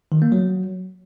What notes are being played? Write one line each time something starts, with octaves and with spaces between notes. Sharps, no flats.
D#3
A#3
F#3